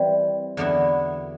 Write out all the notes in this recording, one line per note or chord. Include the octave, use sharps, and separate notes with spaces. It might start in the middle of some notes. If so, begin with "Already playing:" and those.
Already playing: E3 G3 C4
E2 D3 F#3 B3 E4